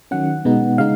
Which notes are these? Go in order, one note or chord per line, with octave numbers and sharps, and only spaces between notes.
D#3 F#3 C#4 F#5
B2 G#3 B3 D#4
C#3 G#3 D#4 F5